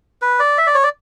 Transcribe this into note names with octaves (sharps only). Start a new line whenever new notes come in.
B4
D5
E5
D5
C#5
D5